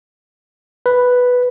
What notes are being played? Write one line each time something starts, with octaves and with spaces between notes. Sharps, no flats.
B4